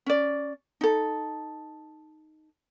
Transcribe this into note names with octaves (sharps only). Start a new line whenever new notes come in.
C#4 D5
D#4 A4